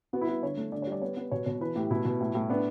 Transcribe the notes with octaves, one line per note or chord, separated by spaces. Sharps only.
B3 F#4
E4
B3 F#4
D3 C#5
A3
D3 D5
C#5
G3 D5
B3 C#5
B3
B2 C#5
B2 C#5
E3 B4
A2 G4
B2 E4
B2
A2
A2
B3 D4